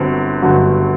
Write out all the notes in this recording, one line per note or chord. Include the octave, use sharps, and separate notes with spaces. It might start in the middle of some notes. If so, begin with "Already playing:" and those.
Already playing: G1 G2 F#3 C4
G1 G2 F#3